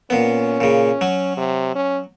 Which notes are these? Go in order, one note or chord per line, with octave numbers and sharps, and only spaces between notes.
A#2 B3 C#4
A#2 C#3
F#3
C3
C#4